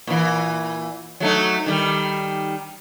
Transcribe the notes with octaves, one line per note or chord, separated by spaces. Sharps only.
A#2 E3
F#3 A3 D#4
D#3 G3